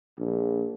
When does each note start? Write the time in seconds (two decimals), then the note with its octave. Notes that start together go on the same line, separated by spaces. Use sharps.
0.18 A#1